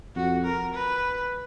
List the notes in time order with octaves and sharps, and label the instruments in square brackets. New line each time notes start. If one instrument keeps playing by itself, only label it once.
[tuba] F2 [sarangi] F#4
[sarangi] A#4
B4